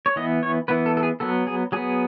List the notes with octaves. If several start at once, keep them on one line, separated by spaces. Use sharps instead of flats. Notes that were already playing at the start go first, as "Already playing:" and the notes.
C#5
E3 B3 D#5
C#5
E3 B3 B4
A4
A4
G#4
F#3 B3 A4
G#4
F#3 B3 G#4